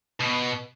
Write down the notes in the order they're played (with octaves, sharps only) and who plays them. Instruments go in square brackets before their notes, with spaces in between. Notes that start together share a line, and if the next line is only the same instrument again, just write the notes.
[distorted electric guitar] B2